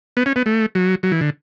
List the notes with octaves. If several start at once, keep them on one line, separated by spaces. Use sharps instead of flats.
B3
C#4
B3
A3
F#3
F#3
E3
D3